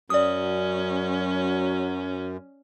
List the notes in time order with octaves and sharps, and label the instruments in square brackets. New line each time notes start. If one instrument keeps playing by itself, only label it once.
[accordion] F#2 [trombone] F#3 [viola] C#4 [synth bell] D5 D#6